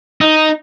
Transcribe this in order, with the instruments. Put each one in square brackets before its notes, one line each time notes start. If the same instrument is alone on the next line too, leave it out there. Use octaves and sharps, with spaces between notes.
[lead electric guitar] D#4